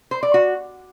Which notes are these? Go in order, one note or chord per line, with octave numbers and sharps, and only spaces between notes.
C5
D5
F#4